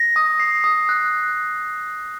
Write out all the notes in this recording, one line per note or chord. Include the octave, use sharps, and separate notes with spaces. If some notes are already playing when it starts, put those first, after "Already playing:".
Already playing: A#6
D#6
C7
D#6
F#6